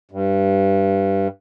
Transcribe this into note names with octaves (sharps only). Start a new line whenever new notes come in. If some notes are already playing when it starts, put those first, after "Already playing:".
G2